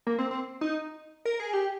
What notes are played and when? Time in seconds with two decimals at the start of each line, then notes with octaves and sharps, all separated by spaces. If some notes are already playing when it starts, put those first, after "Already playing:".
0.07 A#3
0.19 C4
0.31 C4
0.61 D#4
1.25 A#4
1.40 G#4
1.53 G4